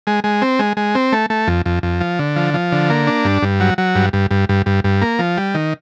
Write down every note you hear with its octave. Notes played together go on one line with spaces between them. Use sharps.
G#3
G#3
C4
G#3
G#3
C4
A3
A3
F2
F2
F2
F3
D3
F3
F3
D3
A#3
D4
G2
G2
F#3
F#3
G2
G2
G2
G2
G2
G2
A#3
F3
G3
D#3